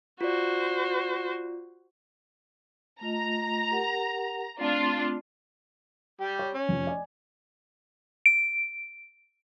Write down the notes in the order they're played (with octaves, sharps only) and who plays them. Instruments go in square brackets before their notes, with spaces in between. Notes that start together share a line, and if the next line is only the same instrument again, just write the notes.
[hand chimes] F4 D5 [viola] F#4 C5
[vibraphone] A3 F4 D#5 [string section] A#5
[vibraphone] G4 A#4 F#5
[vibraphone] A3 C4 [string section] D4 F4
[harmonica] G3 G4
[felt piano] C#5
[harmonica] C#4
[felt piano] F1 F3
D5 D#5 G#5
[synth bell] D7